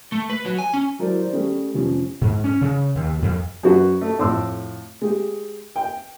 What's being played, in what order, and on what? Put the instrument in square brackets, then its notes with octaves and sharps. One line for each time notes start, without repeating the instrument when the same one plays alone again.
[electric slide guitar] A3
B4
F#3
G#5
C#4
[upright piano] F#3 E4 A#4 C5 D5
C5 D5
G3 A3 C#4 G#4
F1 F3 C#4
[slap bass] G#2
C#4
C#3
D#2
F2
[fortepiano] F#2 F#4 B4
A3
F2 A2 C#5 C6 D6 E6
G#3 G4
G5